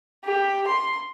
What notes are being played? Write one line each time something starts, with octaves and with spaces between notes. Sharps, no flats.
G4
C6